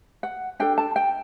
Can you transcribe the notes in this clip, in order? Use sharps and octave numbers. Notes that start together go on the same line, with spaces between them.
F#5
D4 A4 G5
A5
G5